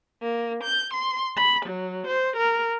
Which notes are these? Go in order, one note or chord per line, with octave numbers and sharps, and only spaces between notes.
A#3
G6
C6
B5
F#3
C5
A#4